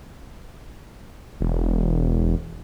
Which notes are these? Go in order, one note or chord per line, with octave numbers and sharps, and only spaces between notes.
E1